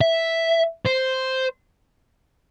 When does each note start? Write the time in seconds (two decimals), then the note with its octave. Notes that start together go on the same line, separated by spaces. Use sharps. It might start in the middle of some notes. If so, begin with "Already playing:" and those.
0.01 E5
0.85 C5